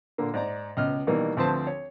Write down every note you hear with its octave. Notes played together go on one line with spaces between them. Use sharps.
A#2 D3 A#3
G#2 D5 A#5
C#2 B2 D#5 F6
B2 D#3 E3 G3 A#3
D2 F3 C4 B4 C5 A5
C#5